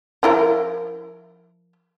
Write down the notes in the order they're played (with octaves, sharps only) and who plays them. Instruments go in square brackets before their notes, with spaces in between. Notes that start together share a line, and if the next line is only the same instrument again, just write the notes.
[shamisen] F3 E4 A#4